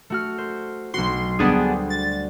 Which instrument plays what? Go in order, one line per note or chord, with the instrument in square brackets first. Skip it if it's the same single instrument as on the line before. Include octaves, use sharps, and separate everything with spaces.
[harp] A3 F#4 F6
C5
[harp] B1 B3 F#4 [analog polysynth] C6
[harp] D2 G3 C5 [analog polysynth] B3 D4 G#4
[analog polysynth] A6